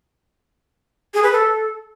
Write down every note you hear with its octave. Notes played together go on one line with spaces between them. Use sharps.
G#4
B4
A4